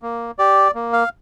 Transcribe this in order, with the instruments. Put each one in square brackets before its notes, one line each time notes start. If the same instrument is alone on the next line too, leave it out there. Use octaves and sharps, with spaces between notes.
[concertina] A#3
G4 D5
A#3
F5